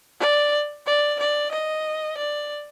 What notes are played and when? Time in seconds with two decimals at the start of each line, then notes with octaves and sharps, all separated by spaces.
0.20 D5
0.86 D5
1.19 D5
1.51 D#5
2.18 D5